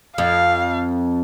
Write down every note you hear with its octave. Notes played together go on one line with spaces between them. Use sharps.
F2 F5